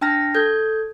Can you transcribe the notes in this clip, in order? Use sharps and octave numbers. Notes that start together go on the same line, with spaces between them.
D4 G5 A5 F6 A#6
A4 G6 G#6